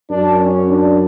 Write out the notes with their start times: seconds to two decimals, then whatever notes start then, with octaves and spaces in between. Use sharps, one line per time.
0.10 F#2 D4
0.39 C#4
0.68 D4